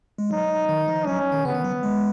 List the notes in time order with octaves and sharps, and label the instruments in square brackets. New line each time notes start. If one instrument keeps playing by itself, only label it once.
[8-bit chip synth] G#3
[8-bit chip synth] F#3 [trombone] D#4
[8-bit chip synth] D#3
F3
[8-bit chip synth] F#3 [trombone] C#4
[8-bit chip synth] D#3
[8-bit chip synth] C#3 [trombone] B3
[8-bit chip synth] D#3
F#3
G#3